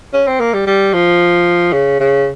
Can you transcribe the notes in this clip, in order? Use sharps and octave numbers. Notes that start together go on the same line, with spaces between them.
C#4
C4
A#3
G3
G3
F3
C#3
C#3